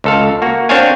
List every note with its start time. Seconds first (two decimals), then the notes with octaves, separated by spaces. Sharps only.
0.04 C#2 A4 F5
0.42 A#3 F#4
0.69 C4 D4 C5 C#5 F5 G#5